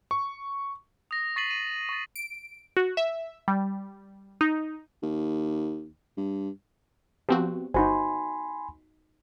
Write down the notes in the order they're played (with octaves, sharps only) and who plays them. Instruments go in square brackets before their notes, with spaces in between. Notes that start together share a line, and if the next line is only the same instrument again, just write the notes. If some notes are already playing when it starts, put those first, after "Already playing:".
[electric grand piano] C#6
[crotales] D#6 A#6
C#6 A6 B6 C7 D#7 F#7
D#7
C#6 A6
[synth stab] D7
F#4
E5
G3
D#4
[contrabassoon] D#2
G2
[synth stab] F3 C4 F#4 [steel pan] B3 G4
[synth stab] G1 [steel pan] D#4 F#4 C5 [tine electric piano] G#5 B5 C6